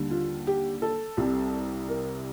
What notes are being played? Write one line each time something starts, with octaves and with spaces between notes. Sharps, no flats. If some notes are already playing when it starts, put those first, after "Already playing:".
Already playing: D#2 D3 G3
F4
G4
A4
C2 C3 G3
A#4